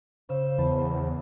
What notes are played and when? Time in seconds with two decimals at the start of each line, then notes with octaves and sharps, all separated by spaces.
0.29 C#3 C5 E6
0.58 E2 B4 A5 B5